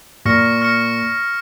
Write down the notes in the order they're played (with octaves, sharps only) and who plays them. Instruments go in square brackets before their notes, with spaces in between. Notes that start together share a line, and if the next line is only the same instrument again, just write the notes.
[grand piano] A#2 [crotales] C#6 F6 A#6 C#7
[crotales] C#6 F6 A#6 C#7